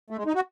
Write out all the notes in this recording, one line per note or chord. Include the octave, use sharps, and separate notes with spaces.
A3
G#3
D#4
F#4